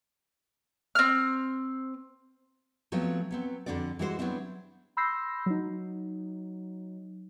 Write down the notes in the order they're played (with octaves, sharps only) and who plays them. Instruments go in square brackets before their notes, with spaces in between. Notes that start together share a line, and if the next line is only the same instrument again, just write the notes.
[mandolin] C4 F6
[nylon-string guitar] F3 F#3 A3 B3 C4
F#3 B3 C4
F2 D3 D4 F#4 D5
E3 G3 G#3 F#4 G4 C5
F#3 B3 C4 D4 E4
[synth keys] B5 C6 E6 G6 A#6 C7
F#3 D#4